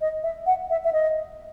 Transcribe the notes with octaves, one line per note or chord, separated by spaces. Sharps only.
D#5
E5
F#5
E5
E5
D#5